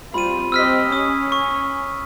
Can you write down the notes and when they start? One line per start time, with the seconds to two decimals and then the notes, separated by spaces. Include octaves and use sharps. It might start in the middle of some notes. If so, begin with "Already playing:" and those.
0.14 G3 C4 F4 B5 D#7
0.52 C4 G4 D#5 E6 F6 B6
0.92 C#4 D#6
1.32 C#6